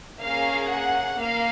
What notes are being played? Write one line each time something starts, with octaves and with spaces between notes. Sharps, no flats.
A#3 C#4 G#4 F5
F#5
A#3 F5